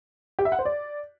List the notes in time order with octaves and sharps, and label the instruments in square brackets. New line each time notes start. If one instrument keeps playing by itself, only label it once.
[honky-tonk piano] G4
E5
F#5
C5
D5